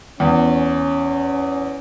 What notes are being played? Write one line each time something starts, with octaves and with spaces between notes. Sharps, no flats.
E2 C#4